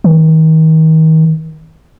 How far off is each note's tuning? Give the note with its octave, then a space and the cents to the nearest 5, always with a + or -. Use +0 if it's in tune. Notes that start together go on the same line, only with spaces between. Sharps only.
D#3 +35